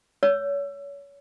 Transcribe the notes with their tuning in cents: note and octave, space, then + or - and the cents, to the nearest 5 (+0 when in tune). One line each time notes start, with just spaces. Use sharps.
C#5 +25 E6 +25